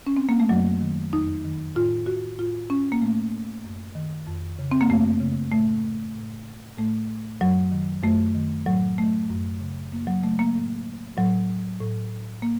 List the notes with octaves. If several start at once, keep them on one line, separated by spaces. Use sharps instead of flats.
C#4
C4
A#3
A3
F#2 F#3
D#3
F2 D#4
D#3
A2 F4
F#4
A2 F4
C#4
A#3
A2 A3
F#2
D#3
F2
C#3
C4
A#3
F#2 A3
C#3
A2 A3
A2
A2 A3
F#2 F#3
D#3
F#2 A3
D#3
A2 F#3
A3
F#2
C#3
F#2 A#3
F#3
C#3 A3
A#3
A2
A2 F#3
A2
A#3